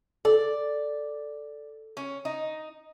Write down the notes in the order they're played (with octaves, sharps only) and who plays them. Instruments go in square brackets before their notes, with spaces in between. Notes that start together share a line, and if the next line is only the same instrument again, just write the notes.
[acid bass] A4 [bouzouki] D5
[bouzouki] C#4
D#4